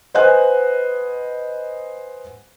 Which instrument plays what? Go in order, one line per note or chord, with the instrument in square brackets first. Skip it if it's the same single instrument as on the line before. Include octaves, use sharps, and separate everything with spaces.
[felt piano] B4 C5 D#5 F#5 G#5 F#6